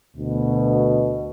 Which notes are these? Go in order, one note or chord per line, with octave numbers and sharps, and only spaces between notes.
D2 B2